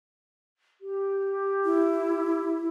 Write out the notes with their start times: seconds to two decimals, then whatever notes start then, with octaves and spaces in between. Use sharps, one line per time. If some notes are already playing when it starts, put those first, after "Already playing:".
0.81 G4
1.64 E4